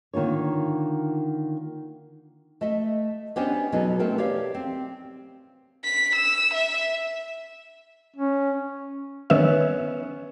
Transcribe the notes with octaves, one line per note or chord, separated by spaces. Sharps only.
D3 D#3 A#3 F4 C#5
A3 D#5 E5
B3 C#4 D4 G4 C5 D#5
B2 F#3 B3 D#4 G#4 A4
A3 B3 C4 A#4
G4 C#5 D5 F5
C4
B6
E6
E5
C#4
D#3 B3 C#4 E5